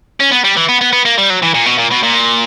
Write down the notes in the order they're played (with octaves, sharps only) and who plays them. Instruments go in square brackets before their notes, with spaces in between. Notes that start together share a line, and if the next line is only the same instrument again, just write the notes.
[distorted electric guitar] C#4
B3
G3
E3
B3
B3
B3
A#3
G3
F#3
E3
A#2
B2
A#2
B2
A#2